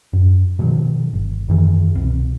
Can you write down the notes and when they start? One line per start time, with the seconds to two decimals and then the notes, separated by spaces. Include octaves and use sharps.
0.13 F#2
0.59 B2 D#3 F3 F#3
1.13 G1
1.48 F#2 D#3 E3
1.95 C2 B2